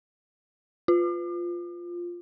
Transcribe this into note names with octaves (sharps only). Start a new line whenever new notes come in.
F4